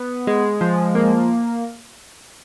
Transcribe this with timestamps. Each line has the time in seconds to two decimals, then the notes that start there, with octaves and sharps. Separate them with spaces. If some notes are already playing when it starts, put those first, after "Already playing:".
Already playing: B3
0.27 G#3
0.61 F3
0.95 A#3